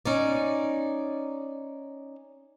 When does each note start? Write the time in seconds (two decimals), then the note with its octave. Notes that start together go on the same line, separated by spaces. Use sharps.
0.05 C#4 D#4 D5